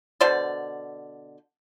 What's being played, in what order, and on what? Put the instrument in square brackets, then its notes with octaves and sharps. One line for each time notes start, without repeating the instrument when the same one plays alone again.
[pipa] B2 D3 C5 D5